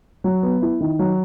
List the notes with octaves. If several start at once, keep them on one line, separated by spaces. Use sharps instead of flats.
F#3
B3
E4
D#3
F#3